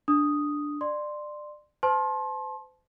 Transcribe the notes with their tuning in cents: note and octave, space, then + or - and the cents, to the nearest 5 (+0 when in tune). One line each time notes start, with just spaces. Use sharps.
D4 +0 D#6 +0
D5 +25 C6 +0
C5 -40 A5 -25 C6 +30